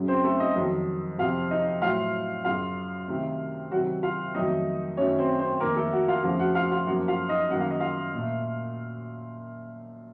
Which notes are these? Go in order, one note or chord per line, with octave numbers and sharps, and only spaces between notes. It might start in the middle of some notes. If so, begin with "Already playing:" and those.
Already playing: F#2 C#3 F#3
C4 C5
A3 A4
D#4 D#5
F2 D#3 F#3
F2 C3 F3 F4 F5
D#4 D#5
A2 F#3 A3 F4 F5
F#2 C#3 F#3 F4 F5
C3 D#3 A3
C3 D#3 F#3 F#4 F#5
F4 F5
F2 D#3 F#3 A3 D#4 D#5
F#2 D#3 F#3 A3 C#4 C#5
C4 C5
C4 C5
F2 D#3 A#3 A#4
A3 A4
F#4 F#5
F4 F5
F2 C#3 F3 A3 F4 F5
F#4 F#5
F4 F5
F4 F5
F#2 F3 A#3 F#4 F#5
F4 F5
D#4 D#5
F#2 D#3 A#3 F#5
F5
D#5
F4 F5
A#2 A3